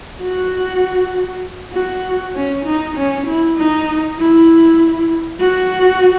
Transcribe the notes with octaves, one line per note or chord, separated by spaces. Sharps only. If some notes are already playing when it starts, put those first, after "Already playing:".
F#4
F#4
C#4
D#4
C#4
E4
D#4
E4
F#4